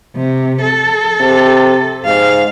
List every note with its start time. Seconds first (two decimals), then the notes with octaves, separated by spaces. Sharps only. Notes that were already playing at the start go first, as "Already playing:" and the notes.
0.16 C3
0.61 A4
1.20 C3
2.05 G#2 F5